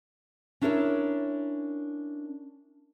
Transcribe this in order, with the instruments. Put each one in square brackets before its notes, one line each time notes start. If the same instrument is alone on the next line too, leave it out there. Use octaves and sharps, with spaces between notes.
[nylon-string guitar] C#4 D4 E4 A#4 B4 C#5